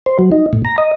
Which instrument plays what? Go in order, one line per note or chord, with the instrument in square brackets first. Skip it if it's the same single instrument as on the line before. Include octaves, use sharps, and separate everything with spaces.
[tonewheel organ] C5
F#3
D#4
A2
A#5
D#5